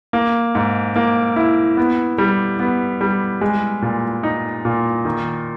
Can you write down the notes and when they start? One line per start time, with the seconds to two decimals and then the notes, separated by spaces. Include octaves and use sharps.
0.13 A#3
0.55 G#2
0.96 A#3
1.36 E4
1.77 B3
2.18 G3
2.59 B3
3.01 G3
3.41 G#3
3.82 A#2
4.23 D#4
4.65 A#2
5.05 D#3